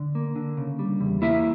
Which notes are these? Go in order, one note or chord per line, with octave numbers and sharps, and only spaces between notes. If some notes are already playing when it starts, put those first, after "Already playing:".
Already playing: D3
A#3
D3
C#3
G3
E2
A#3 E4 E5